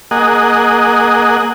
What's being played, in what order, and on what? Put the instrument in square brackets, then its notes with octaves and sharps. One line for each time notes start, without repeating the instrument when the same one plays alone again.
[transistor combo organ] A#3 G#4 D#5 F#5